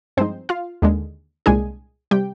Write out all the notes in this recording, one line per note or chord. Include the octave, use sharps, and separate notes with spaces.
G2 F3 G#3 C4 D#4 C5
F4 F5
D#2 D3 G#3
C2 A#2 G#3 D4 G#4 G#5
C3 G3 G4 G5